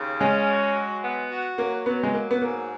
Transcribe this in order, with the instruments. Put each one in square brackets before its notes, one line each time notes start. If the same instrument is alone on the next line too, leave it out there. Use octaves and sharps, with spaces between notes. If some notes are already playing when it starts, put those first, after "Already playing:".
Already playing: [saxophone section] D#2 C#3
[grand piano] G#3 [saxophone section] C#4
[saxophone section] F#4
F#3
B3
F#4
[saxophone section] F#3 [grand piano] A#3
[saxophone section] F#3 [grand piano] B3
[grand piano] G#3
[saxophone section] F#3 [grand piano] A#3
[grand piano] B3
[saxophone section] G#2 [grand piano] A#3